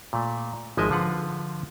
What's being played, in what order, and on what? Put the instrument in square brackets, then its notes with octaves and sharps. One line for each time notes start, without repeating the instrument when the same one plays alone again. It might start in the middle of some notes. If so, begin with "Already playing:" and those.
[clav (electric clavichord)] A#2 A3
G#1 F3 G#3 D#5 E5 G#5
D3 F3 F4 B4 F#5